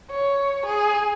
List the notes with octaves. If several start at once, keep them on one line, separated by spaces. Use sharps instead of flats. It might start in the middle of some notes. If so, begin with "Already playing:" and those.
C#5
G#4